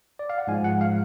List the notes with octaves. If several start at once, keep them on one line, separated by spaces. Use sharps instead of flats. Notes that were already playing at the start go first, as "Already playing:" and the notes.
D5
F5
F#5
G#2 F3 G#3 G#5
F#5
F5